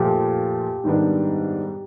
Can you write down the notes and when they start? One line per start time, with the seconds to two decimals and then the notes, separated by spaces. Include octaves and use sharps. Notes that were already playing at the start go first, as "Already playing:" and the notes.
Already playing: A#2 F3 A3 G4
0.84 G#2 D#3 G3 B3 D4